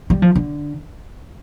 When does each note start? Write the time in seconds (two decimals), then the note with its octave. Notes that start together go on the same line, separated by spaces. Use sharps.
0.10 G3
0.22 F3
0.35 D3